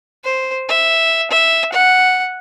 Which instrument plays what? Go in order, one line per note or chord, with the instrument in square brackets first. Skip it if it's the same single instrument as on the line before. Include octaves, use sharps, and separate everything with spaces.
[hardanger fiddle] C5
E5
E5
F#5